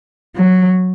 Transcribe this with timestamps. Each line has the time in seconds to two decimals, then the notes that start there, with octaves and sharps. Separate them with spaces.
0.36 F#3